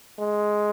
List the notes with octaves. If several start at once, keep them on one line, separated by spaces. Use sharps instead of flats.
G#3